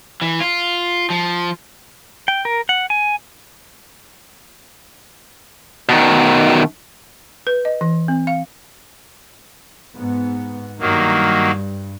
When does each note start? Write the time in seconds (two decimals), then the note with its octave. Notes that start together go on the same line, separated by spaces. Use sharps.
0.22 E3
0.40 F4
1.10 F3
2.28 G5
2.45 A#4
2.69 F#5
2.90 G#5
5.89 B2 D#3
7.47 B4
7.65 D#5
7.81 E3
8.08 C4
8.27 F5
9.96 G#2 B3
10.80 G2 D#3 F#3 A#3